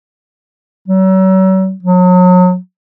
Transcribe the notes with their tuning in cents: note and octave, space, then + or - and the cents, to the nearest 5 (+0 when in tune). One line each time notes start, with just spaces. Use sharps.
F#3 +40
F#3 -30